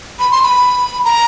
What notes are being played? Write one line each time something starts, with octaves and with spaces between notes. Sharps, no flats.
B5
C6
B5
A#5